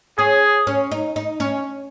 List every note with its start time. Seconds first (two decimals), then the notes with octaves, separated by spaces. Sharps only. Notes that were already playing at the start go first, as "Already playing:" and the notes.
0.18 C#4 G#4
0.67 C#4
0.92 D#4
1.16 D#4
1.40 C#4